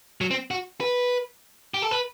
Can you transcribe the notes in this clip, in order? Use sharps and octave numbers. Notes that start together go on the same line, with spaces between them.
F#3
C4
F#4
B4
G4
A4
B4